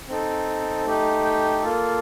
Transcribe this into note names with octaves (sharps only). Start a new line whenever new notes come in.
C4 D#4 A4
A3 D#4 G4
G5
A#3 F4 A4